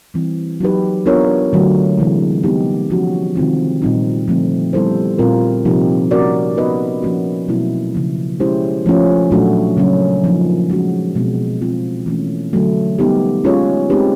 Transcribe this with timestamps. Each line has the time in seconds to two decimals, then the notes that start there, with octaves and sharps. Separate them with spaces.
0.14 E3 G3 C4
0.61 F#3 A#3 D#4 G4 B4
1.06 B3 D4 F4 A#4 C#5
1.53 D3 F#3 A3
1.98 C3 E3 G#3
2.43 G3 B3 D#4 G4
2.90 F3 A#3 C#4 F#4
3.35 C3 D#3 G#3 C4 F4
3.82 A#2 G3 C4 D#4
4.28 D3 F3 A3 C4
4.73 G3 B3 E4 A4 C5
5.18 A#2 G3 C4 F4 A#4
5.65 C3 F3 A#3 D#4 G4
6.11 A#3 C#4 F#4 A#4 D5
6.57 B3 D#4 F#4 B4 D#5
7.02 F3 A#3 C#4 F#4
7.48 B2 F#3 A3 C4 E4
7.94 C#3 F3 A#3
8.40 G#3 C#4 E4 G4 C5
8.86 F3 A3 C#4 F4
9.31 A#2 F#3 A3 D4 F#4
9.77 C#3 F#3 A#3 C#4
10.24 F3 A#3 D#4
10.70 G#3 C#4 F#4
11.15 B2 G#3 C4
11.61 G#3 C4 F4
12.06 E3 A3 C#4
12.53 D3 F#3 A3
12.99 G3 B3 D#4 G4
13.44 G#3 C#4 F4 G#4 C#5
13.90 G#3 C4 D#4 G4 B4